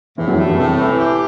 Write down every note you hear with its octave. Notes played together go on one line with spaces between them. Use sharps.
E2 A2 E3
F#2 F#3
G2 G3 A3
E2 E3
C2 A2 C3
E3
G4